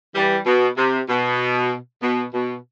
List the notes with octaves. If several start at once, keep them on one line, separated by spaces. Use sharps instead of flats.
E3 G3
B2
C3
B2
B2
B2